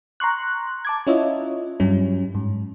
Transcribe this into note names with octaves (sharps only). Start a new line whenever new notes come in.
A#5 C6 C#6 F#6
A5 D6 G#6
C#4 E4 F4 C#5 D#5 E5
G2 F#3 G3 C#4
G#2